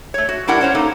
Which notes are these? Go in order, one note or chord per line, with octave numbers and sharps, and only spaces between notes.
A3 C#5
F#4
G3 D4 E4 A#4 F#5
C#4 C5 C#5
A#3 D#4 A4